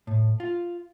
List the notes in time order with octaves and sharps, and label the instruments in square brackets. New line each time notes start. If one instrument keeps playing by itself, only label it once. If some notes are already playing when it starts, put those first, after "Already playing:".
[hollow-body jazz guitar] A2
F4